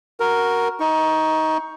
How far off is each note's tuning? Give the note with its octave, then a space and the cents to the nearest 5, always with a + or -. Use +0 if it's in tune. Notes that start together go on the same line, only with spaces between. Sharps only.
F#4 +0 A#4 +0
D#4 +20 C#6 +0